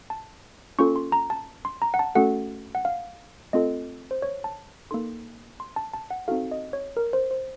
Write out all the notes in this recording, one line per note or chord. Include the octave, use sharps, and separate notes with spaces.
A5
A#3 C#4 F4 A4 C#6
C6
A#5
A5
C6
A#5
F#5
A5
A3 C#4 F#4 A4 F#5
F#5
F5
A3 C4 F4 A4 D#5
C5
C#5
A5
A#3 D#4 A4 C6
C6
A5
A5
F#5
C4 D#4 F#4 A4 F5
D#5
C#5
A#4
C5
C5